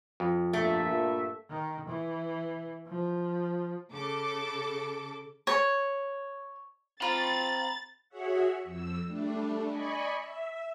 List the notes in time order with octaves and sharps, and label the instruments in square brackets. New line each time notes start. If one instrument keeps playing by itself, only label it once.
[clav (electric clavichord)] F2
[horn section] G2 A#2 E5 [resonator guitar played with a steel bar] A3
[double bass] D#3
E3
F3
[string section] C#3 A4 D6
[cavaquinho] C#5
[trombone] C4 [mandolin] F4 [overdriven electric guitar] A#5 B5 [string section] A6
[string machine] F#4 G#4 C#5 E5 F#5
F2 E6
G3 A3 D4
D5 D#5 G#5 B5 C#6
E5